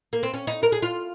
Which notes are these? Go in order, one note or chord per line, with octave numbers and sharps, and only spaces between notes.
A#3
C4
C#4
D#4
A#4
G#4
F4